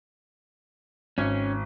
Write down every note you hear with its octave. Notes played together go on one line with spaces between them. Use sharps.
G#1 C#4